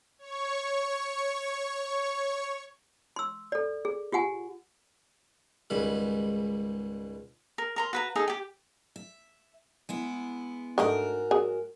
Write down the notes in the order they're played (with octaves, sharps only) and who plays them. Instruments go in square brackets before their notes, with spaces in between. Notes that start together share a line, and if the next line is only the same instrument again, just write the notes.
[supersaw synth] C#5 C#6
[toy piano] C6 E6
A4 D5
G#4
F4 G4 F#5 G#5
[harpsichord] C#2 G#2 D#3 G3 B5
[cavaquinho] A#4
A#4 A#5 C6
F#4 B4 A#5
D#4 G#4 A4
G4 G5
[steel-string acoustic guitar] E5
G#3 B3 E4
[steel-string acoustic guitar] G#2 F#4 A#4 [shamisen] D3 A3 D#4
[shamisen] F#3 G#4